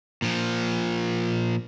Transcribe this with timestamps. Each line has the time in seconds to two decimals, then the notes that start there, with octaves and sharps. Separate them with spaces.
0.22 A#2 F3